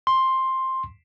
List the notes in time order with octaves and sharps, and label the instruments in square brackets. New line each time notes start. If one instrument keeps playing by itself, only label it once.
[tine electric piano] C6